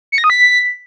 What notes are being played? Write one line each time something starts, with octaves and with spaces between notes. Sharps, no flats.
C#7
A#6
D#6
B6